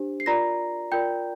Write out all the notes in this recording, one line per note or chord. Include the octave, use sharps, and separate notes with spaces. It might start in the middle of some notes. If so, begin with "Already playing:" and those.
Already playing: D4 G4 C5
C7
F4 A#4 D5 A#5 A#6
F4 A#4 D5 G5 G6